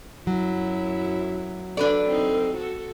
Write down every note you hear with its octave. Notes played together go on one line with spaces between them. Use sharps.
F#2 F#3 E4
D4 A4 B4 D5
C4 D#4
F#4 A4